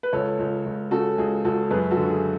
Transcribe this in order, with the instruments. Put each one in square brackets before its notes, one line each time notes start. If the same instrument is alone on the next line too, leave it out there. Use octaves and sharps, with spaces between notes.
[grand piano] B4
C#2 A4 C#5
C#2
C#2
C#3 F#4 A4
C#2 G#4
C#2 F#4 A4
F#2 G#4 B4
F#4 A4
D3
G#4